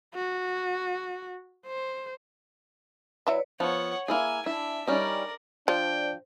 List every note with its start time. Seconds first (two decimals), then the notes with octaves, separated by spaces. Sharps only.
0.15 F#4
1.67 C5
3.27 F#3 E4 B4 C#5 D5 E5
3.60 F3 B3 C#5 F#5
4.08 A#3 E4 G#4 G#5
4.46 D4 E4 E5
4.87 G3 C#4 D#4 A#4 D5
5.68 F3 D4 C5 D5 G5